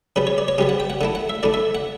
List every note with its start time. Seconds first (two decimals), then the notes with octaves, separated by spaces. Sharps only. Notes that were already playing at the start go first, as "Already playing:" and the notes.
0.16 C#3 G3 B3 B4
0.27 C#5
0.38 D5
0.48 C#5
0.58 C#3 G3 B3 G4
0.69 F#5
0.80 G5
0.90 F#5
1.01 D3 A3 E4 F#5
1.15 F#5
1.30 E5
1.43 D3 A3 E4 D5
1.54 E5
1.75 F#5